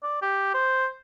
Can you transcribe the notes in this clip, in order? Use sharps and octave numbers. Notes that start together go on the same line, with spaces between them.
D5
G4
C5